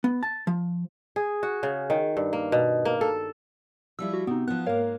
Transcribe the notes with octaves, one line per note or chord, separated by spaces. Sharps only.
B3
A5
F3
G#4
F#4
C#3
D#3
G2
A#3
B2
A#3
A4
F3 G3 E4 E6
F#4
C3 B3 D#4
F3 B3 F#6
G#2 A#3 A#4 C#5 F5